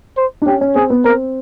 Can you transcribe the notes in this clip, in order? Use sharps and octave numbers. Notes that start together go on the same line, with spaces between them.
C5
D4
C#4 G4
C#4
C4 G#4
B3
C4 A#4